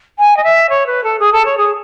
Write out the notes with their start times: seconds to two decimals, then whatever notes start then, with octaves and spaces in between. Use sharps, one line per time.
0.18 G#5
0.36 D#5
0.44 E5
0.69 C#5
0.86 B4
1.03 A4
1.19 G#4
1.32 A4
1.45 C#5
1.57 G#4